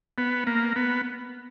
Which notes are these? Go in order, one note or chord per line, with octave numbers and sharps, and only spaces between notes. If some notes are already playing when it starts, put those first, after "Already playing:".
B3
A#3
B3